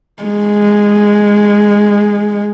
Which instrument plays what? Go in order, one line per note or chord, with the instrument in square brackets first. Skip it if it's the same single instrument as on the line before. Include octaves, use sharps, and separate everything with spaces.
[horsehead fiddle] G#3